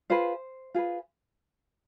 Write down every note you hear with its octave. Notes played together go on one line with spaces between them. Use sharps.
F4 G#4 B4 C5
F4 G#4 B4